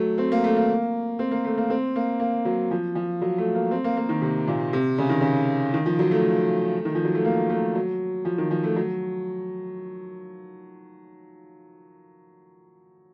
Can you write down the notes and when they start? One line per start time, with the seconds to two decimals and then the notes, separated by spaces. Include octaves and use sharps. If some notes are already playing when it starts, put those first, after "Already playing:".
Already playing: F#3 A3
0.18 C4
0.32 A#3
0.44 A3
0.57 A#3
1.19 C4
1.31 A#3
1.44 A3
1.58 A#3
1.70 C4
1.96 A#3
2.20 A#3
2.45 F#3
2.71 F3
2.95 F3
3.21 F#3
3.38 A3
3.55 A#3
3.71 C4
3.84 A#3
3.97 A#3
4.09 D#3
4.22 C3
4.48 A#2
4.73 C3
4.98 C#3
5.09 D#3
5.21 C#3
5.74 D#3
5.86 F3
5.99 F#3
6.11 A3
6.85 D#3
6.95 F3
7.05 F#3
7.15 A3
7.25 A#3
7.50 A3
7.75 F#3
8.25 F3
8.38 D#3
8.51 F3
8.63 A3
8.76 F#3